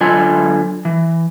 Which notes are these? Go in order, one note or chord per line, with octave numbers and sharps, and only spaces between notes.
D3 F#3 F4 G#5
E3